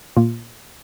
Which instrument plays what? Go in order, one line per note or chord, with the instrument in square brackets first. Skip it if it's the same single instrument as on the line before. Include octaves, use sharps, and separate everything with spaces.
[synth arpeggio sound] A#2 A#3 F4